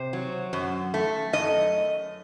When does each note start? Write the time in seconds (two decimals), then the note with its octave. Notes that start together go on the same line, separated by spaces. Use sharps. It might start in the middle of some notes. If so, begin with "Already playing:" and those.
Already playing: C3 C5
0.13 F#3
0.53 F#2
0.94 A3
1.33 F#2 D#5